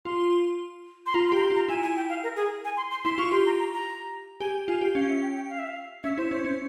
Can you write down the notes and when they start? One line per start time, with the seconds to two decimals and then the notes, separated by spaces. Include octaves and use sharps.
0.05 F4 C6
1.06 C6
1.14 F4 A#5
1.28 C6
1.32 G4
1.37 A#5
1.42 C6
1.50 F4
1.55 A#5
1.68 E4 G#5
1.83 G#5
1.96 G5
2.09 F5
2.23 A#4
2.36 G#4
2.65 G#5
2.77 C6
2.91 C6
3.04 E4 C6
3.18 F4 C#6
3.32 G4 C6
3.46 A#5
3.59 A#5
3.73 A#5
4.40 G4 G#5
4.68 F4 G#5
4.81 G4
4.95 C#4 F5
5.09 E5
5.22 G5
5.36 G5
5.49 F5
5.59 E5
5.68 F5
6.03 C#4 E5
6.17 E4 C5
6.31 C#4 C5
6.45 C#4 C5